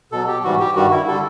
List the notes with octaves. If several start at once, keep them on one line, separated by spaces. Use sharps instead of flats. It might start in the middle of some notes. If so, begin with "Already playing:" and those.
B2 F#3 A4
G4
G#2 E3 G3 F#4
G4
G2 D#3 G3 F#4
E4
D3 G3 A4